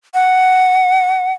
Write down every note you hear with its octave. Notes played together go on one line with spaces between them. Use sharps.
F#5